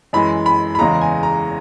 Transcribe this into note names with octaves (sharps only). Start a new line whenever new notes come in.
F#2 E3 G#3 B5
B5
B5
E2 C#3 E3 G#3 A#5
G#5
A#5